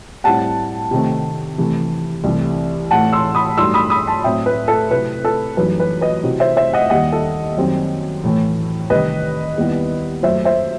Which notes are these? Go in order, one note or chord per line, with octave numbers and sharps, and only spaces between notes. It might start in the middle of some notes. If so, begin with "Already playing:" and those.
A2 G3 C4 E4 F#5 A5
C3 D#3 A3 C4
C3 E3 A3
C2 C3 E3 A3
A2 E3 A3 F#5 A5
C6 E6
B5 D#6
G2 F#3 A3 D#4 C6 E6
B5 D#6
B5 D#6
A5 C6
A2 F#3 C4 E5 G5
B4
A4
C3 F#3 A3 C4 E4 B4
A4
F#2 E3 G3 D#4 B4
B4
B4 D#5
C3 F#3 C4 E4
C5 E5
C5 E5
D#5 F#5
D#2 D#3 G3 D#5 F#5
A4
F#2 D#3 G3 C4
A2 E3 A3
C2 C3 D#3 B4 D#5
D#2 D#3 G3 B3 E4
F#2 F#3 A3 C5 E5
C5 E5